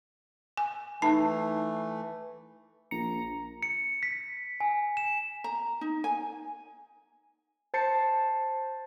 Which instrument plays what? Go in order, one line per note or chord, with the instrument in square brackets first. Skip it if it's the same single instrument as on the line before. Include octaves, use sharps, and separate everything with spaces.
[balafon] G#5
[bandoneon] E3 A3 [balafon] D#4 A5
[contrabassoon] A#1 [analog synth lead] A#5 [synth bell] C#7
[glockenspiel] C#7
B6
G#5
E7
[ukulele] A#5
D#4
G#5
[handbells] C5 A5 A6 C7 C#7